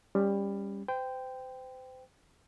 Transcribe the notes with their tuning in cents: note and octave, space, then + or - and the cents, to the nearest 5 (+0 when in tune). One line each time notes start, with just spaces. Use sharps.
G3 +20 C#4 +0
C5 -35 G5 +0